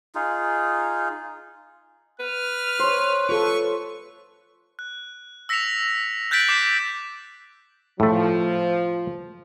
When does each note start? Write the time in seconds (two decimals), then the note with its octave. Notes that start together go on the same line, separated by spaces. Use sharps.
0.15 D#4 F4 G#4
2.20 B4 F6
2.79 C5 C#5
3.29 F4 A4 C#6
4.79 F#6
5.49 E6 A#6 B6 C#7 E7 F7
6.31 F#6 G6 A6 B6 D7 F#7
6.49 D6 C7 E7
8.00 A2 F3 A3